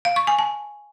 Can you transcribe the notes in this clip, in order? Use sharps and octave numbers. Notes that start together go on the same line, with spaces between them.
F5
C#6
G#5
A5